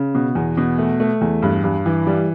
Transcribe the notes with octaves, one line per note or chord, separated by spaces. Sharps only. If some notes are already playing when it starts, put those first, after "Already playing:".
Already playing: C#3
B2
E2
B2
A3
A3
E2
G2
G2
E3
G3